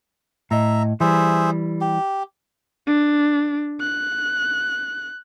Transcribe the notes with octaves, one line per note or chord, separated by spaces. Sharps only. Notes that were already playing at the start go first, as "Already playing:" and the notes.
A2 D#5 E5 A#5
E3 G3 G#4 C5 E5
G4
D4
F#6